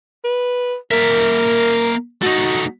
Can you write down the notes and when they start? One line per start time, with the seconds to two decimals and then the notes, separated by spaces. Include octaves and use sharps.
0.24 B4
0.91 A#3 A#4 E5
2.22 A3 D#4 F#4